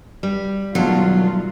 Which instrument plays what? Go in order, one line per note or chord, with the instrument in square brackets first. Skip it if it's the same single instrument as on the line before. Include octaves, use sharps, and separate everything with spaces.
[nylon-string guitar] G3
[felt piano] E1 A5 [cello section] D#3 A3 F4 [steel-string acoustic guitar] F#3